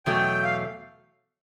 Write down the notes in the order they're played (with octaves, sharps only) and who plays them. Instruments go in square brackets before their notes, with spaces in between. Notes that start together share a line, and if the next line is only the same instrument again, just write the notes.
[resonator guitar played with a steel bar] E2 B2 F#3 A3 [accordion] G5
[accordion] F5